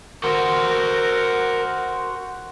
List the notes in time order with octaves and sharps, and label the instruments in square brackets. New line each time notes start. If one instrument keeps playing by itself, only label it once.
[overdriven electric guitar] F#4 C5 [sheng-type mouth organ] A#4